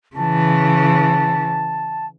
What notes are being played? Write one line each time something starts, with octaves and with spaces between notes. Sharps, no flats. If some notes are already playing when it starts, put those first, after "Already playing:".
C#3 E3 A5